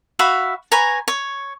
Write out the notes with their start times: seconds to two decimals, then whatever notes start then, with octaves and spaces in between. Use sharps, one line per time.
0.19 F#4 E5 F5 B5
0.72 B4 C#5 G#5 A#5
1.08 C#5